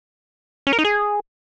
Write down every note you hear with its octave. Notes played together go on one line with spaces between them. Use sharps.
C#4
A#4
D#4
G#4